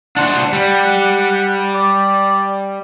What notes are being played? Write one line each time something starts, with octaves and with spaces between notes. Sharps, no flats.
D4 C5 F#5
G3
D5